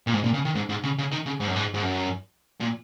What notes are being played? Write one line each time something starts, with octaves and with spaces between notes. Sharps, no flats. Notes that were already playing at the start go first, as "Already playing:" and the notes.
A#2
G#2
A#2
C#3
D#3
G#2
G#2
C#3
C#3
D#3
C#3
G#2
F#2
G#2
G#2
F#2
A#2